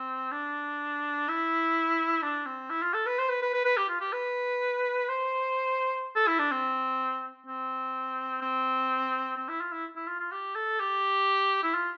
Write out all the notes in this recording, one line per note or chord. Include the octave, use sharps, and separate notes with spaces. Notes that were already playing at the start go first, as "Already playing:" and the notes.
Already playing: C4
D4
E4
D4
C4
E4
F4
A4
B4
C5
B4
B4
B4
B4
G4
F4
G4
B4
C5
A4
E4
D4
C4
C4
C4
C4
E4
F4
E4
E4
F4
F4
G4
A4
G4
E4
F4